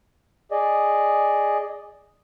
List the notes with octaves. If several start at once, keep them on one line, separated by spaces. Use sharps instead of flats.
G#4 D5 D#5